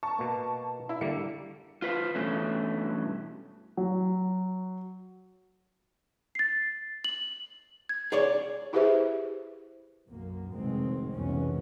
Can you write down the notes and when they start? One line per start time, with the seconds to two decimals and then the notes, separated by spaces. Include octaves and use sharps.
0.03 A5 A#5 C#6
0.18 B2 A#3 B3
0.89 E4
1.01 D3 G3 A#3 C#7
1.82 F4 B4 C5 F5
2.15 G2 B2 E3 A3 C#4
3.77 F#3
6.35 A6 C7
7.04 F#7
7.89 G#6
8.12 G#4 C#5 D5
8.73 E4 G4 G#4 B4 C5 E5
10.08 B1 F#2 A#3
10.54 F1 C2 B2 D#3 G#3 C4
11.13 F1 C2 B2 E3 G#3 C#4